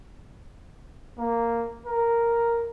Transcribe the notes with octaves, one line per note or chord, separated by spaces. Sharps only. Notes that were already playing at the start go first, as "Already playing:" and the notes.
A#3
A#4